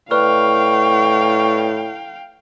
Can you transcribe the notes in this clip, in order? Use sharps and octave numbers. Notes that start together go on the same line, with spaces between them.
A2 B4 D5 F5 G5 C#6 F6